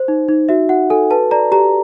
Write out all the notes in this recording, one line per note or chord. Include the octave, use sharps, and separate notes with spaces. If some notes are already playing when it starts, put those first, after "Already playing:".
Already playing: C5
D#4
D#4
F#4 E5
F#4 F#5
A4 G#5
B4 A5
D5 A#5
G4 A#5